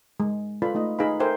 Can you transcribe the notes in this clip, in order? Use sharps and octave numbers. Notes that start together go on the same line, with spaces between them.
G#3
F4 A4 B4 D5 B5
A3 D#4 D#5
D#4 G#4 B4 F5 B5
A4 A#4 C5 E5 G5 G#5